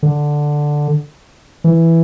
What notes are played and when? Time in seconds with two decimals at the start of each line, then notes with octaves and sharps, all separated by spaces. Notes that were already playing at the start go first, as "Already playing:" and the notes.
0.03 D3
1.64 E3